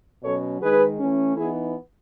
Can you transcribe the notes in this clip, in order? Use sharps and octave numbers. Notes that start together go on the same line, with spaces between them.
B2 F#3 C#4 A4 C#5
D#3 G#3 D#4 G#4 B4
E3 A3 C#4
E3 B3 D#4 E4 G#4